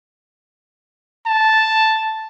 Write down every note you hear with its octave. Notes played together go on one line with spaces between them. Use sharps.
A5